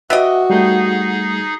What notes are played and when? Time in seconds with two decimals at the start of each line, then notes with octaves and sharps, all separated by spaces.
0.10 B3 F#4 G4 D#5 E5
0.50 G3 A3 D#4 G#4 G6